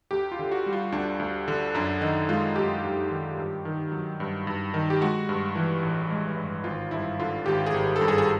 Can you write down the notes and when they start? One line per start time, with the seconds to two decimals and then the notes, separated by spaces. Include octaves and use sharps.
0.11 D2 G4
0.32 F4
0.39 D3
0.52 F#4
0.66 G3
0.73 F4
0.92 D2 D4
1.20 D2
1.48 D3
1.75 F#2 D4
2.01 D#3 D#4
2.29 G#3 F4
2.56 F#2 G4
2.84 F#2
3.10 D#3
3.37 G2
3.65 D#3
3.92 F#3
4.20 G2
4.47 G2
4.74 D#3
4.90 G4
5.01 G#3 F#4
5.29 G2
5.55 E3
5.83 A1
6.10 G#3
6.37 G2
6.64 G#1 F4
6.91 G2 E4
7.20 D3 F4
7.46 G#1 G4
7.66 G#4
7.74 G#1
7.96 A4
8.01 G2
8.08 G#4
8.18 G#4